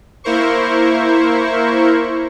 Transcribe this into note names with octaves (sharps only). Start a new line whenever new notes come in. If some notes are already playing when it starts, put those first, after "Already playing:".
A#3 E4 A#4 C5 C#6